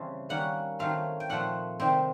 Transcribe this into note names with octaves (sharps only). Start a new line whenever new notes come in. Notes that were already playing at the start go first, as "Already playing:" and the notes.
Already playing: C#3 E3 G3 C4 A5
D#3 G3 A#3 C#4 F#5
D#3 F#3 A3 C4 F5
G5
A#2 F3 A3 C4 F#5
C3 D#3 G3 C4 G5